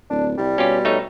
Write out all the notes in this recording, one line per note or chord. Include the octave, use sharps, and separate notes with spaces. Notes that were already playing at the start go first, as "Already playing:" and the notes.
D1 D4
C2 G3
B2 C#4 F4 G4
A3 D#4 C#5